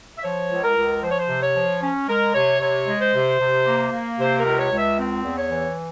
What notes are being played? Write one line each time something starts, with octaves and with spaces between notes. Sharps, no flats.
E5
F3 C#5
C#2
A#4
C#2
F3 C5
C#5
C5
C3
C#5
F3
C#4
G#3 A#4
C3 C#5
C3 C#5
G#3
C5
C3
C3
A#3
A#3
C3 C5
A#4
C#2
C#5
C#2
E5
C4
E2
C#5
E3